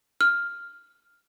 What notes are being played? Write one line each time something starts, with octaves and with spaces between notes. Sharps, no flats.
F6